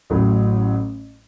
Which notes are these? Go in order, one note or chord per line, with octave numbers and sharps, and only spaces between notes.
A1 A2 F#3